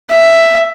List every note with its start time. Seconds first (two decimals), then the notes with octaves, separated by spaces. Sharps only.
0.10 E5